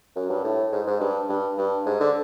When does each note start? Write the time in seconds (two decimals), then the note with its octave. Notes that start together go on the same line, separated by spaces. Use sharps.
0.16 F#2
0.30 G2
0.44 A2
0.72 G#2
0.87 G#2
1.00 G2
1.29 G2
1.57 G2
1.86 G#2
2.00 D3